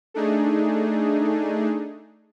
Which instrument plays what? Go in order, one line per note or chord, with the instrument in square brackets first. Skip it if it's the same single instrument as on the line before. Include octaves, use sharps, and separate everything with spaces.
[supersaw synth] A3 D4 D#4 G#4